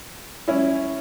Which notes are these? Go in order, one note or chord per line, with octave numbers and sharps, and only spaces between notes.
C#4 E4